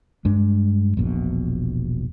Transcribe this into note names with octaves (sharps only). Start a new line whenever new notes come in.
G2 G#3 D4
E1 A#1 B2